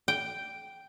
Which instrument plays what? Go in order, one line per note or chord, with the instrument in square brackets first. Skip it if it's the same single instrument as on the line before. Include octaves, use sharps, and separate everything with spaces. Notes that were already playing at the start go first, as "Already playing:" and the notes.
[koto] G5